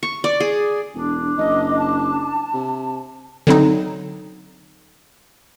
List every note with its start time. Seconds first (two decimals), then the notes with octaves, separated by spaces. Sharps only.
0.03 C#6
0.24 D5
0.40 G#4
0.94 E1 D4
1.38 F#1 D#5
1.79 A5
2.54 C3
3.47 D3 F#3 C4 D#4